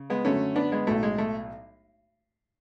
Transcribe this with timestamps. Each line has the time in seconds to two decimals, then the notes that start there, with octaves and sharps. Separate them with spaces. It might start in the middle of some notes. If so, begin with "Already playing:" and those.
Already playing: C#3
0.10 G#3 B3
0.25 F#2 D3 F#3 A3 C#4
0.56 B3 D4
0.72 G#3 B3
0.87 B1 A2 F#3 A3
1.03 G#3
1.18 A3